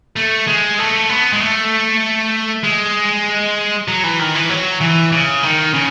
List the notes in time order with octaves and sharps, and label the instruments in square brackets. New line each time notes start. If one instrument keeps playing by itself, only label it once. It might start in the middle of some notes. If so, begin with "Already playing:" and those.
[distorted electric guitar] A3
G#3
A3
B3
G#3
A3
G#3
F#3
E3
D#3
E3
F#3
E3
C#3
D#3
C#3